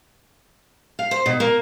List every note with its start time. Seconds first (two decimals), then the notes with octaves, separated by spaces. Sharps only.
0.99 F5
1.11 C5
1.26 B2
1.40 A#3